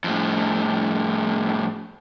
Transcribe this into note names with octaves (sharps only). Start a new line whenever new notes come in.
F2 A2